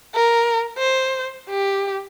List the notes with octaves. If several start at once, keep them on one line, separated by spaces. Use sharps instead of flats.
A#4
C5
G4